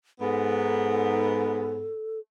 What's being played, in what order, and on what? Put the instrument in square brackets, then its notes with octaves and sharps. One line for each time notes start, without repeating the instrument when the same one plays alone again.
[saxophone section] G#2 B3 [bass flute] A4